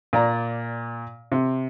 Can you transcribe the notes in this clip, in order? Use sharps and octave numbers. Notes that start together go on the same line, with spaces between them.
A#2 D5 A#5
C3